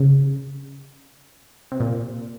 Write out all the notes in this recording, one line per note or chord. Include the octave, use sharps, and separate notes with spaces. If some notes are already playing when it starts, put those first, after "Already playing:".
Already playing: C#3
C3
A#2